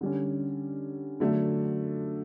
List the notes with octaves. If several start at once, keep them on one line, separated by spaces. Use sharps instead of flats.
D3 G3 C#4
D3 F#3 A3 D4